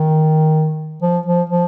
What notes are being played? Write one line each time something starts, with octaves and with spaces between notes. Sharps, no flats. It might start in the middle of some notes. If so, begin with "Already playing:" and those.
Already playing: D#3
F3
F3
F3